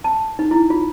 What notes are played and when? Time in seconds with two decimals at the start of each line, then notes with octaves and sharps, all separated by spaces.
0.04 A5
0.39 D#4
0.51 E4
0.70 F4